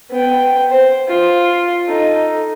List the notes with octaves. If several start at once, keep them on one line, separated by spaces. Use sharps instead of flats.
B3 G5
C5
F4
D#4 A4